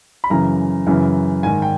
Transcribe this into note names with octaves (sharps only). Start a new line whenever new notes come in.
B5
F#2 C#3 E3 A#5
F#2 C#3 E3
G#2 D#3 G#5
G5